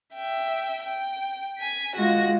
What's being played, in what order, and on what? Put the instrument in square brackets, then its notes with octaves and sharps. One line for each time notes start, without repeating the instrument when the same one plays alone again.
[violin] E5 G5
G5
G#5 B6
[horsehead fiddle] G#3 F4 [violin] F#4 A#6